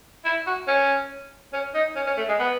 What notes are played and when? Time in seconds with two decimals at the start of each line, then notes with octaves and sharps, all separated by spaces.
0.25 E4
0.46 F#4
0.68 C#4
1.53 C#4
1.74 D#4
1.96 C#4
2.07 C#4
2.17 A3
2.28 G#3
2.39 B3